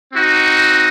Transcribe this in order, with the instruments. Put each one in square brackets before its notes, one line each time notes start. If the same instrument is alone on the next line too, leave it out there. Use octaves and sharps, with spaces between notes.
[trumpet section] C4 D#4 F#4